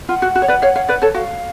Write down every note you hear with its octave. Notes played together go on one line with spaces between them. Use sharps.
F4 F#5
F#4
F#4
C#5
B4 D5
C#5 F5
C#5 F5
B4 D5
A4 C#5
F#4 F5